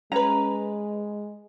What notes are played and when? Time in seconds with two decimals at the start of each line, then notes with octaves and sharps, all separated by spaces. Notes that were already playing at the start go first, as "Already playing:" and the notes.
0.12 G#3 C#4 B4 A#5